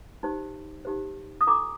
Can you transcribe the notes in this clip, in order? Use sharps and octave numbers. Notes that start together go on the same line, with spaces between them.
D#4 G4 C5
D#4 G4 C5
D#6
D4 F4 A4 A#5 D6